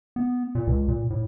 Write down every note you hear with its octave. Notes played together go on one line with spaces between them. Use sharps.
B3
A#2
C#2
A#2
A2